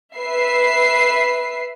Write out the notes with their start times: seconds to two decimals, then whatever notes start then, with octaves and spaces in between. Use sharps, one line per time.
0.17 B4 E5 C7